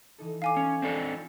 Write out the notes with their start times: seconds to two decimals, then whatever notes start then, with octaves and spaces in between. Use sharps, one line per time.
0.18 E3 D#4 A4
0.42 D#4 F5 G#5 D6
0.57 C#4
0.82 C4 D4 A4 A#6
0.96 F4